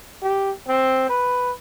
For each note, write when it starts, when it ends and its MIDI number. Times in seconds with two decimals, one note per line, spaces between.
0.23 0.51 67
0.68 1.08 60
1.09 1.51 71